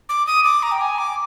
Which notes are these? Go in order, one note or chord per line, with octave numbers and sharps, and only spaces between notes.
D6
D#6
D6
A#5
G5
G#5
D6